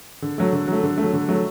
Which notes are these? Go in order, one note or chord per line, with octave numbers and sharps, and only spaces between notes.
D3
F#3 A3
D3
F#3 A3
D3
F#3 A3
D3
F#3 A3